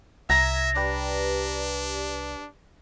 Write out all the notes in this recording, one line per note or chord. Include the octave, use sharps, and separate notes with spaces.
C2 E5 A#5 G#6 A#6
D4 G4 B4 D5